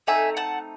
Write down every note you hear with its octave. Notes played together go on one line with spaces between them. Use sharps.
A3 C4 D#4 E5 G#5
F#5 A5